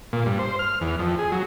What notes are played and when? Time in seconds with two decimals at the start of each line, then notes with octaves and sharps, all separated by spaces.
0.13 A#2
0.26 G2
0.39 C5
0.59 F6
0.81 E2
0.99 F2
1.19 G#4
1.32 F#3